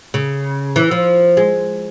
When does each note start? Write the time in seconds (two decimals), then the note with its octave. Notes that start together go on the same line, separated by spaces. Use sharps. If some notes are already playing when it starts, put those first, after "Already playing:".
0.14 C#3
0.76 E3
0.91 F3
1.37 G#3